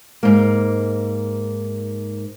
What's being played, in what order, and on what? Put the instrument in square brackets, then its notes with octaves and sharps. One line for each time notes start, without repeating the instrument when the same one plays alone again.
[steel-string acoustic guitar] G#2 A#3